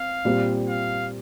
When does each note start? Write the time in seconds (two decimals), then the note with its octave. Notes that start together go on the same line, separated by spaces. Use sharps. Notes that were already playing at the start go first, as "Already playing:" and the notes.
Already playing: C4 F5
0.25 A#2 G3 C4
0.69 F5